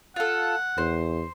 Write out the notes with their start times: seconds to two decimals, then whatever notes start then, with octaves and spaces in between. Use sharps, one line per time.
0.16 F4 A4 F#5
0.78 E2 C5